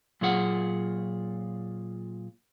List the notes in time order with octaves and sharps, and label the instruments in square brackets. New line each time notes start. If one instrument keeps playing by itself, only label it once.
[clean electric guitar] A#2 F#3 A#3 F4 G#4 F#5